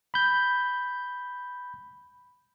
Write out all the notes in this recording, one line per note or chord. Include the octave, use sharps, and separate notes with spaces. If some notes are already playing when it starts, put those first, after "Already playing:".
B5 G6